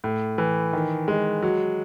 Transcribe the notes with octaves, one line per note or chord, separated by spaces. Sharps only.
A2
E3
D#3
G#3
F#3